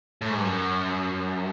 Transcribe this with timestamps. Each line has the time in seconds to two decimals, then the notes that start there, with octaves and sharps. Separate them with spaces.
0.21 A2
0.30 G#2
0.37 G2
0.45 F#2